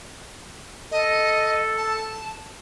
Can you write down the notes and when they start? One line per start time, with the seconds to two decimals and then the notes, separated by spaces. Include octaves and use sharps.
0.91 A4 D#5
1.77 A5